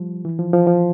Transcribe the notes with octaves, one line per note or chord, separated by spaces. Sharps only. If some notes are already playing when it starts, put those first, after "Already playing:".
Already playing: F3 G3
E3
F3
F3
F3